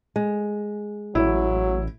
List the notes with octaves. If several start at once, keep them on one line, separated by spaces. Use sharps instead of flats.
G#3
A1 F#3 E4